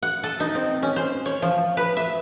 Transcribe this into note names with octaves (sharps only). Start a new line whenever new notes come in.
F#5
A4
D#4
C4
C#4
C5
C#5
F3
B4
E5